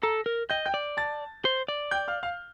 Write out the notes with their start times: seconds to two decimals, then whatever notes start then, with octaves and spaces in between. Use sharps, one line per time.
0.03 A4 A#5 A#6
0.26 A#4
0.50 D#5 G5 G6
0.65 G5 G6
0.74 D5
0.97 A5 A6
1.45 C5
1.68 D5
1.91 G5 G6
2.08 F5 F6
2.23 F5 F6